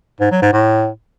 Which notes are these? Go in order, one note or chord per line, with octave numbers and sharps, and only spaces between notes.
G#2
F#3
G#2
A2